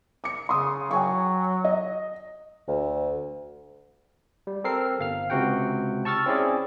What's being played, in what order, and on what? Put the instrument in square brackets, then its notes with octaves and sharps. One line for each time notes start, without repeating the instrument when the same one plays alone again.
[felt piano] D6 C#7
[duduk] C#3 [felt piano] C6 D#6
[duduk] F#3 [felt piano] G5 G#5 C#6
[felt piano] D#5
[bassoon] D2
[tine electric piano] G3
C4 A4 A#4 C7
G1 F5 F6
C#2 C3 F#4 F#5 G5
A5 C#6 E6 F6 A6
C4 C#4 E4 G#4 D5